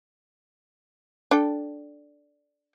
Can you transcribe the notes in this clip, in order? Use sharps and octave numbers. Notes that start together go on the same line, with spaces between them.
D4 A4 G5